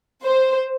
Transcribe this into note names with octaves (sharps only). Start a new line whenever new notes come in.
C5